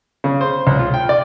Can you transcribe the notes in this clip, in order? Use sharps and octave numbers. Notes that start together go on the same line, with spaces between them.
C#3
C5
C#2
F4
G5
D5